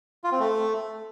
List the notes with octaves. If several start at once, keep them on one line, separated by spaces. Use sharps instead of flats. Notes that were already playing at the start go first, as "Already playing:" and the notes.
F4
C4
A3